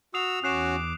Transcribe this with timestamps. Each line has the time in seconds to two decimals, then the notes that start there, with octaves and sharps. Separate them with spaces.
0.14 F#4 D#6 E6 C7 F7
0.44 E2 C#4 F#4 D6 F#6 C7 E7